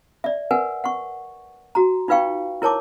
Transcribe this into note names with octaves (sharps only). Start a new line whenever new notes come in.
D5 E5
A#4 B4 F#5 G#5
F#5 C#6
F#4 A#5
D#4 F4 B4 F5 G5 C#6
E4 A#4 C#5 A5 D6